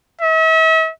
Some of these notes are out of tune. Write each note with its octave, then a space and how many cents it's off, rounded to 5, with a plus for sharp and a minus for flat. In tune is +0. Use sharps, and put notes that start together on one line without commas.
E5 -40